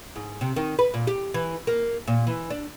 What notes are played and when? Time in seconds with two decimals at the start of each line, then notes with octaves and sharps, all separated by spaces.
0.16 G#2
0.41 C3
0.56 D#3
0.79 B4
0.94 A#2
1.07 G4
1.34 E3
1.67 A#3
2.08 A#2
2.27 E3
2.50 D4